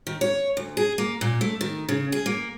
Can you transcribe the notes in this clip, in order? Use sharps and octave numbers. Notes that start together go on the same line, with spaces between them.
D#3
C#5
D2
G#4
A#3
A#2
A3
D#3
C#3
G#4
A#3